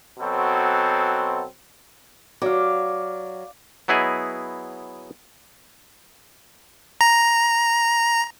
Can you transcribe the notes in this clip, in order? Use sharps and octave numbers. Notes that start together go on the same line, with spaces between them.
B2 F#3 C4 F#4 A4 C5
F#3 D5 F5
F#3 B3 E4 G#4 D#5
A#5